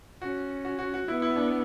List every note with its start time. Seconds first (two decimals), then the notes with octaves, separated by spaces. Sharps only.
0.22 C#4 F#4
0.65 F#4
0.79 F#4
0.94 F#4
1.07 B3 E4
1.22 E4
1.36 D4